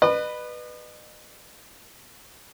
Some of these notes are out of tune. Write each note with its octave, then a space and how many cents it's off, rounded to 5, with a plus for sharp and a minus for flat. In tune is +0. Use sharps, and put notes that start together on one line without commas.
B4 +0 D#5 -40